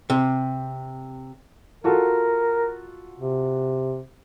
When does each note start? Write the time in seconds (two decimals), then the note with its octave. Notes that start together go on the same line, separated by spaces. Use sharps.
0.10 C3
1.84 F4 F#4 A4 A#4
3.18 C3